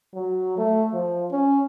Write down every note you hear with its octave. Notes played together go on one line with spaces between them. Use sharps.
F#3
A3
F3
C#4